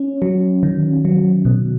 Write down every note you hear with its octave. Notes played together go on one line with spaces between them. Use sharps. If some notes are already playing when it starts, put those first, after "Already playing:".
Already playing: C#4
F#3
D#3
F#3
B2